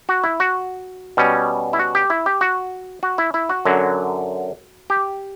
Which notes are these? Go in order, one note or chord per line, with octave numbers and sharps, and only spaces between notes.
F#4
E4
F#4
B2 G3 C#4
E4
F#4
G4
E4
G4
F#4
F#4
E4
E4
F#4
F#2 D3 F#3
G4